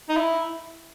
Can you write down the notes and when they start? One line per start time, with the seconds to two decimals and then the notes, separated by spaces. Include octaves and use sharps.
0.09 D#4
0.17 E4